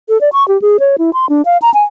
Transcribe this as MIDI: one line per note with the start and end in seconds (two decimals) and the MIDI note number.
0.09 0.20 69
0.21 0.29 74
0.33 0.46 85
0.48 0.60 67
0.62 0.77 68
0.80 0.96 73
0.98 1.11 64
1.13 1.29 84
1.29 1.42 62
1.45 1.58 77
1.62 1.73 82
1.74 1.83 80